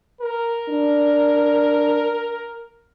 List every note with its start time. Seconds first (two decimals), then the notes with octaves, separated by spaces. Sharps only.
0.21 A#4
0.70 D4